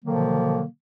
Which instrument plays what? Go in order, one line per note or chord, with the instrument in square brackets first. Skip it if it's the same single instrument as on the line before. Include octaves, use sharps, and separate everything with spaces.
[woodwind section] B2 D3 D#3 F3 F#3 A#3